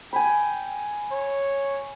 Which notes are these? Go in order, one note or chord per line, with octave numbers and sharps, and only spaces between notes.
G5 G#5 B5
C#5